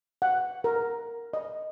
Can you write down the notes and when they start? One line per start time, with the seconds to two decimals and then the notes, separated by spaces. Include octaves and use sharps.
0.22 F#5
0.64 A#4
1.33 D#5